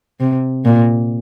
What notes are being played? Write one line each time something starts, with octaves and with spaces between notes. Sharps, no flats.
C3
A#2